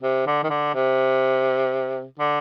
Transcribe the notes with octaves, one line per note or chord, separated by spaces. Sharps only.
C3
D3
D#3
D3
C3
D3